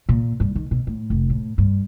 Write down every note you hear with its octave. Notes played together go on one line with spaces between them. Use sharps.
A#2
G2
D#3
B2
A2
F1
A2
G2